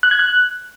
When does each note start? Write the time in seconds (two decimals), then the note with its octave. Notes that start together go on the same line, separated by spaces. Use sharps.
0.03 F#6
0.11 G#6
0.19 F#6